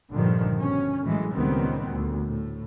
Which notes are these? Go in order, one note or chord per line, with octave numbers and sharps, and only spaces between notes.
A#1 G2 D3 D#3 F3
B2 C#4
A2 E3 F#3 G#3
C#2 A#2 D#3 G3 B3 C4
D2
A2